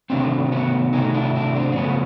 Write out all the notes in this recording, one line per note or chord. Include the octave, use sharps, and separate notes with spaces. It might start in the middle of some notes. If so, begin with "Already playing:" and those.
C3 D#3 F#3 A3 C4 D4
B3 C#4
C3 D#3 F#3 A3 C#4 D#4
D4 E4
D4 E4
C4 D4
C4
F#2 C#3 F3 A3 B3 C#4